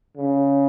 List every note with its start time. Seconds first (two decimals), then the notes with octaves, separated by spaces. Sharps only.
0.17 C#3